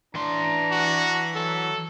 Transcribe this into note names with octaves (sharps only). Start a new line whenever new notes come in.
E3 D4 A#5 C6
F#4
F#3 A4